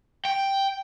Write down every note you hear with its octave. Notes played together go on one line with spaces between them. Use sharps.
G5